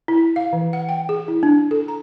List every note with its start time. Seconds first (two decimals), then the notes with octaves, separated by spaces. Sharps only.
0.08 E4
0.36 F5
0.53 E3
0.73 F#5
0.89 G5
1.09 G#4
1.28 E4
1.43 D4
1.71 A4
1.88 A#5